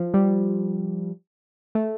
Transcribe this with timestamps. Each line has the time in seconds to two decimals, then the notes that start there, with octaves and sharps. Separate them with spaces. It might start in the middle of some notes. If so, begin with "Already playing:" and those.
Already playing: F3
0.14 G3
1.75 A3